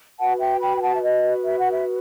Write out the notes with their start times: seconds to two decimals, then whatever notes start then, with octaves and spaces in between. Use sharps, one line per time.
0.19 F#4 B4 F#5 A5
0.40 E5 G5
0.61 G5 B5
0.77 G5
0.82 F#5 A5
0.95 E5
1.02 D#5
1.45 E5
1.58 F#5
1.72 E5